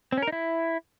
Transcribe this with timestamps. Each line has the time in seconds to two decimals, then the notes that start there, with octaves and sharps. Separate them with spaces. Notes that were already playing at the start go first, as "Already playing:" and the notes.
0.12 C4
0.17 C#4
0.22 A#4
0.27 D#4
0.32 E4